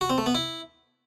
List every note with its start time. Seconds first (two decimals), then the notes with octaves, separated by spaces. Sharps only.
0.01 F#4
0.10 C4
0.18 A3
0.26 B3
0.35 E4